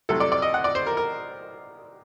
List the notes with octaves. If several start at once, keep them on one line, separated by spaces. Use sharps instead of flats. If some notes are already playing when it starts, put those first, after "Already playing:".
C2 C3 F#3 A3 A4
D5
D5
D#5
F#5
D5
C5
A#4
A#4